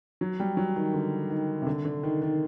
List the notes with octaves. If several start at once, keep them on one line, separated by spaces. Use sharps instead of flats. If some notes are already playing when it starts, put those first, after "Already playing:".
F#3
G3
F#3
D#3
D3
D#3
C3
D3
D3
D#3
D#3